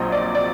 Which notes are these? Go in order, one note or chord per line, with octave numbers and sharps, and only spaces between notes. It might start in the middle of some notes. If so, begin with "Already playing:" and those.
Already playing: A#1 A#2 F#3 C4 D#5
D5
D5